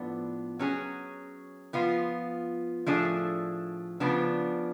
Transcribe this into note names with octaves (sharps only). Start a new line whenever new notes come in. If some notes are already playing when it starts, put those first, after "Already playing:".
Already playing: A2 F3 B3 D4
F#3 C#4 G#4
F3 B3 F4
A2 F3 A3 D4 G#4
C#3 F3 B3 D4